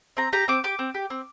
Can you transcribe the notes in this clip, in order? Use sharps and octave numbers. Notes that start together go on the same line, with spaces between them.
C4 A#5
G4 A#5
C4 D6
G4 D6
C4
G4
C4